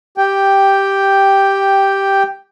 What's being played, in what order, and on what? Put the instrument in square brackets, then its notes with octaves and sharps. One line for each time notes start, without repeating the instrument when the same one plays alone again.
[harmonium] G4 G5